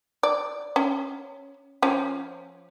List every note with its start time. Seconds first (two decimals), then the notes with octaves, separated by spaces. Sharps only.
0.23 D5
0.76 C#4
1.82 F3 C#4